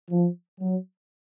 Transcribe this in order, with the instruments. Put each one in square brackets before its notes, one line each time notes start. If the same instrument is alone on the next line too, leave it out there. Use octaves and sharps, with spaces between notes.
[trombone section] F3
F#3